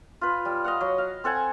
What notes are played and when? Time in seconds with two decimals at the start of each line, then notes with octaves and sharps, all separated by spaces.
0.21 F4 B4
0.45 G3
0.64 D#5 F5 F#5
0.81 F#3
0.98 F5
1.24 C4 A4 F#5 G#5